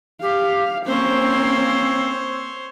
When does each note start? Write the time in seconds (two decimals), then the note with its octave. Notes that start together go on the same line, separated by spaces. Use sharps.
0.22 G4 F5
0.87 A#3 C4 C#4 C5 C#5